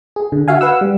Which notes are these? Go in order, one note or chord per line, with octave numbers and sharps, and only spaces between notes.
G#4
D3
F#4 E5 F5 G#5
B4 F5 F#5 E6
G3